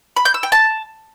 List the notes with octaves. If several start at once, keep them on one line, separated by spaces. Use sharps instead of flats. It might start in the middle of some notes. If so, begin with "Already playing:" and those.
B5
G6
E6
G5
A5